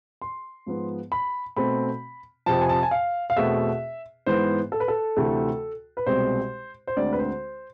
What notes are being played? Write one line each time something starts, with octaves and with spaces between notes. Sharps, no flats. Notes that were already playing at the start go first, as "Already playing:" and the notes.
C6
G#2 F3 B3
B5
B2 A3 C4 B5
F2 C3 F3 A5
G#5
A5
G#5
F5
F5
E2 B2 A3 C4 E5
G#2 E3 B3 C5
A4
B4
A4
D2 C3 E3 A3
B4
C2 B2 G#3 C4 C5
C5
D2 D3 G#3 C4 D5
B4
C5